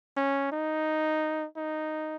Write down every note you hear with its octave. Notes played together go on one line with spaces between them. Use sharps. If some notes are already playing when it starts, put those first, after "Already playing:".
C#4
D#4
D#4